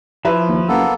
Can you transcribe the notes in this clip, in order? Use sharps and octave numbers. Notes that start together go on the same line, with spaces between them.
F3 E4 B4
D#2
F#1 A#3 B3 A4